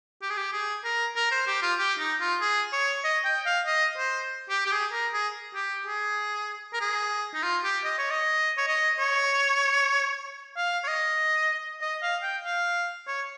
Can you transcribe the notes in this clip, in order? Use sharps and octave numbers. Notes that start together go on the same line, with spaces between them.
G4
G#4
G4
G#4
A#4
A#4
C5
G4
F4
G4
D#4
F4
G#4
C#5
D#5
G5
F5
D#5
C5
G4
G4
G#4
A#4
G#4
G4
G#4
A#4
G#4
D#4
F4
G4
D#5
C#5
D#5
C#5
D#5
C#5
F5
C#5
D#5
D#5
F5
G5
F5
C#5